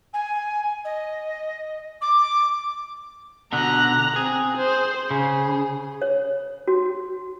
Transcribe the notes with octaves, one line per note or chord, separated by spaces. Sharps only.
G#5
D#5
D6
B2 D3 A#5 F#6
C4 G#4
C5
C#3 G#4
C#5
F#4